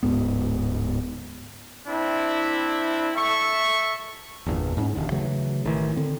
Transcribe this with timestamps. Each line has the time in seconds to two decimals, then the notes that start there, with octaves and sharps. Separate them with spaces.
0.03 D1 E2 G#2 B3
1.87 C4 D4 E4
3.16 A4 E5 C#6
4.46 G1 E2 A#2 E3
4.77 G#2 B3 C#4
4.95 E1 D#2 D3
5.12 C#3 E3 F#3 A3
5.65 A1 D#3 E3
5.96 D3 C4